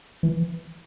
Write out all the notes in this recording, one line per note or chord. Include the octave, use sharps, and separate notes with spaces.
E3